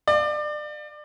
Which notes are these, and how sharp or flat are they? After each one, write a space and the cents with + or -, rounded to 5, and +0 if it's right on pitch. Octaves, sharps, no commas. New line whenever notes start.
D5 +30 F5 +0